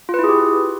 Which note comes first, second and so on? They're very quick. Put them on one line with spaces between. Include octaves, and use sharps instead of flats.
F4 B4 E4 G#4 G4